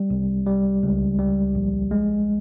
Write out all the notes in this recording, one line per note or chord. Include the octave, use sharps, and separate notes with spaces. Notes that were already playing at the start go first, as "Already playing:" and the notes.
Already playing: G3
C2
G3
C#2
G3
A#1
G#3